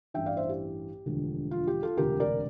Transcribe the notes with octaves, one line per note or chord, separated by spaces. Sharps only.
A1 G2 E3 E5 G5
D5 F5
C5 E5
G4
E1 D2 D3 F3
F4
G4
F4 A4
E1 D2 C3 G4 A#4
A#4 D5